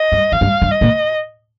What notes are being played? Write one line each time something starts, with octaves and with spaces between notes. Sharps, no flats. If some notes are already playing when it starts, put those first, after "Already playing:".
Already playing: D#5
G2
F2 F5
G2
G2
D#5
A#2